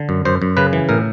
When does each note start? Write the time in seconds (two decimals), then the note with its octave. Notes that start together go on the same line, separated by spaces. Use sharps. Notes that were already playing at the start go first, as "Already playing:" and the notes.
Already playing: D3
0.09 F#2
0.25 F#2 C5
0.42 F#2
0.57 C#3 B4
0.73 E3
0.89 A2 A#4